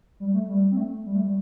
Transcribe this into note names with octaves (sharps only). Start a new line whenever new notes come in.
G3
A3
G3
C4
A3
A3
G3
A3
G3